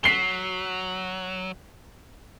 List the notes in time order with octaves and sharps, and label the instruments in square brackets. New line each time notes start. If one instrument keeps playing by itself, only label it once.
[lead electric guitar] F#3 [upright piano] B6 C7 G7